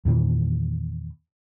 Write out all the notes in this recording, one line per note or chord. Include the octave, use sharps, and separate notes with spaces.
E2 A#2 D#3 E3